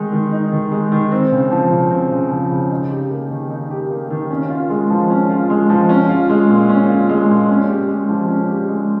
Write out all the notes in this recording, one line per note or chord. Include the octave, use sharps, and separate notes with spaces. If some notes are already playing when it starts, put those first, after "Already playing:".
Already playing: D#3 G#3 D#4
D#3
D#4
D#3
G#3
D#3
C4
C#3
F3
C#3
C4
C#3
F3
C#3
D#4
G4
A#3
D#3
D#4
G4
A#3
D#3
C#4
F4
G#3
F3
C#4
F4
G#3
F3
C#4
F4
G#3
A#2
C#4
F4
G#3
A#2
C#4
G4
G#3
F3
C#4
G4
G#3